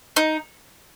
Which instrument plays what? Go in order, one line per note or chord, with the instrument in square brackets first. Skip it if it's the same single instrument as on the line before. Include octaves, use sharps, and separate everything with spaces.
[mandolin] D#4